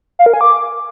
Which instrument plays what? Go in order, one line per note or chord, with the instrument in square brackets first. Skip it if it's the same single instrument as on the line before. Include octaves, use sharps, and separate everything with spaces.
[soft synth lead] F5
A#4
G#5
D6